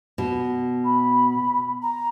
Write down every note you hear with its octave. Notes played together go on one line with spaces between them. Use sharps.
B2
B5
A#5